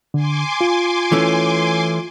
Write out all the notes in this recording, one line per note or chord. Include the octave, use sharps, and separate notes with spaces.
D3 G#5 C6 D6
F4
E3 A3 C#4